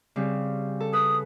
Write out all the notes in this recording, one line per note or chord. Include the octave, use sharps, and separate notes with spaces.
C#3 G3 C4
A4
B4 D#6